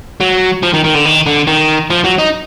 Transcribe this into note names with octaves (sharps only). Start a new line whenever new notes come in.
F#3
F3
D#3
D#3
D3
D#3
D3
D#3
F3
F#3
D#4